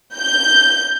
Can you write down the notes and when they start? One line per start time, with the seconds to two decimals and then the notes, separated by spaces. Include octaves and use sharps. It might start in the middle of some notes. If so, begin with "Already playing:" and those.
0.16 G6